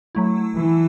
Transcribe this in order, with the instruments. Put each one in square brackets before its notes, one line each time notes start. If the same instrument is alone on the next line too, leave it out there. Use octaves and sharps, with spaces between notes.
[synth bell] F#3 A3 E4
[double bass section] E3